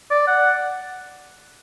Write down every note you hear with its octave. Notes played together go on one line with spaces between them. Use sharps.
D5
F#5